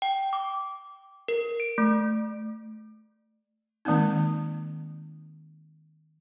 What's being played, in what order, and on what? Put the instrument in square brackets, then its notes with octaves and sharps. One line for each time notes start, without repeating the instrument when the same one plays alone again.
[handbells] G5
D6
A#4
D7
A3
[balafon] D#3 G#3 A#3 C4 D#4